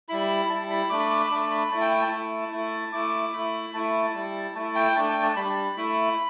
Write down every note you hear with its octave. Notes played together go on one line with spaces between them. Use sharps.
G3 E4 B5
G3 E4 A5
B5
A3 D4 D6
B5
D6
B5
A3 D4 D6
B5
A3 E4 A5
G5
G5
A5
A3 E4
A3 E4
A3 E4 D6
A3 E4 B5
A3 E4 A5
G3 E4
A3 E4 A5
G5
A3 D4 A5
G5
A5
G3 D4 B5
A3 E4 B5